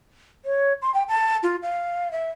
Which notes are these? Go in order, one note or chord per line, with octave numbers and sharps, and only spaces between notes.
C#5
C6
G5
A5
F4
F5
E5